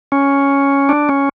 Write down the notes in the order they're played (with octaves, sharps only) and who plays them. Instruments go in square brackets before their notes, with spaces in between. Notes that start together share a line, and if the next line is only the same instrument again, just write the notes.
[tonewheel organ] C#4
D4
C#4